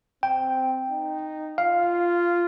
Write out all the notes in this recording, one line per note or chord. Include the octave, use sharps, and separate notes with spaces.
C4 G5
D#4
F4 F5